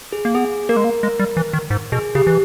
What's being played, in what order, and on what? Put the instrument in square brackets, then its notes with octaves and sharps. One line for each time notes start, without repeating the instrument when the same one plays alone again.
[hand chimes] G#4
[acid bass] A#3
[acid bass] B3 [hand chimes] G#4
[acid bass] A#3 [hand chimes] A#4
[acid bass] G#3
A#3
G#3
G3
E3
D#3
G#2
[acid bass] B2 [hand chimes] G#4
[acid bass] C#3 [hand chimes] G4
[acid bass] E3